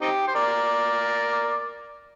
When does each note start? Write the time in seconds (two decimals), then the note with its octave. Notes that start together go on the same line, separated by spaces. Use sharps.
0.02 C4 D#4 G4
0.28 C5
0.35 A#4 D5